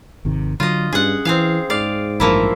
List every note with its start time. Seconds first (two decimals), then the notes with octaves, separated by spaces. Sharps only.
0.25 G#1 C3 D#3
0.60 D3 F#3 F4 D#5
0.93 G2 C#4 D4 G#4 F#5
1.25 E3 C4 G#4 F5
1.70 G#2 D5 F5
2.20 A1 G2 F3 A#3 E4